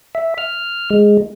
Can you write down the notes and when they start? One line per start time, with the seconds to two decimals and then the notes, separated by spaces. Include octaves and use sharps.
0.15 E5
0.38 F6
0.90 G#3